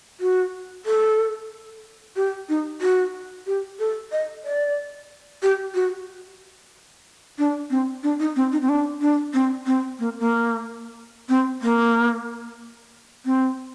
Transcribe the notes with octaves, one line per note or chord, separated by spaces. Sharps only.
F#4
A4
G4
D#4
F#4
G4
A4
D#5
D5
G4
F#4
D4
C4
D4
D#4
C4
D#4
C4
D4
D4
C4
C4
A#3
A#3
C4
A#3
C4